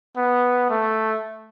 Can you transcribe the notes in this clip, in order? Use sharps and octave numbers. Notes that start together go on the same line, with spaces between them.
B3
A3